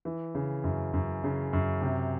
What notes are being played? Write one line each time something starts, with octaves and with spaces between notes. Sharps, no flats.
E3
C#3
F#2
F#2
C#3
F#2
C3